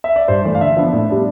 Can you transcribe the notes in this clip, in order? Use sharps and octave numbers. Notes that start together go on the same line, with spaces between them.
E5
D5
G2 C5
E3 A3 D5
F5
D3 E5
F3 B3 D4 E5
A2
G3 B3 D4